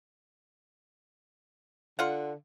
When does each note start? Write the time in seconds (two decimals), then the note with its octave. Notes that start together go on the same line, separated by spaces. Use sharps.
1.99 D3 F4 F#5